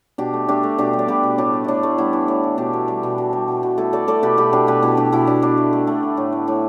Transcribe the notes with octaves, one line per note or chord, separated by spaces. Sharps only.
B2 D4 G4
A3
A3 D4 G4
A3
B2 D4 G4
G3
D5
B2 G4 B4
B2
A2 D4 G4
A3
A2 D4 E4
A3
G3 B3 E4
E3
A2
E3
B2 D4 G4
B2
G3
B2
B2
G3
B2
B2
A3 E4 A4
A3 A4 D5
A3 A4 D5
B2 G4 B4
B2 G4 B4
B2 D4 G4
B2 G4 B4
B2 E4 A4
B2 D4 G4
B2 B3 E4
B2 D4
B2 D4
A3
A3
A3
D3
A2
A2
A2